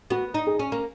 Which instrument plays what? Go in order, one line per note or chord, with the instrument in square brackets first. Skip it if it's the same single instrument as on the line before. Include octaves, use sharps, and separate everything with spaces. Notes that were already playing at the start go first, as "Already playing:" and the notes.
[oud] B3 [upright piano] F#4
[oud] D#4
[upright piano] G#4
[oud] C#4
A#3